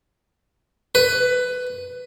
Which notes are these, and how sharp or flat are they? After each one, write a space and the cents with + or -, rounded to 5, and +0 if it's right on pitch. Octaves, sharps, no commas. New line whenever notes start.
B4 +15